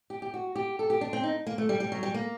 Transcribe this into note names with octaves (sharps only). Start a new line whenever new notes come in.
G4
G4
F#4
G4
A4
G4
D4
C4
D#4
A#3
A3
G3
G3
F#3
G3
A#3